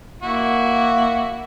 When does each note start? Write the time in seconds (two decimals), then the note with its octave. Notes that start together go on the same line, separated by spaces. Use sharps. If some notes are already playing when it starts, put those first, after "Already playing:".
0.23 A#3 E4 F#4